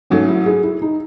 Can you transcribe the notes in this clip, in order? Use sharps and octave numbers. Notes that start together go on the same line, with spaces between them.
G#2 F#3 A3 C#4
E4
G#4
E4
D#4